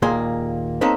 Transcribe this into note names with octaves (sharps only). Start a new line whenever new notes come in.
D#2 A#2 A#3 G#4 C6
A#3 C4 D#4 A4 B4 C#5